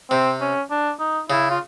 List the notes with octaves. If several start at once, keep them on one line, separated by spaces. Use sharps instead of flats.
C3 C4
C#4
D4
D#4
C#3 E4
F4